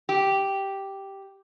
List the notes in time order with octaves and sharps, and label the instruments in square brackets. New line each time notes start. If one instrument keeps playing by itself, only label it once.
[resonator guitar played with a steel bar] G4